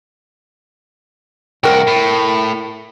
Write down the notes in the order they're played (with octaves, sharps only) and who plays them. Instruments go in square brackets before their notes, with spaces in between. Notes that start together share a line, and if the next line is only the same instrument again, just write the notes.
[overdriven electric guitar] C2 F#4 [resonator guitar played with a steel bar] A#4 G5
[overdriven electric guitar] A2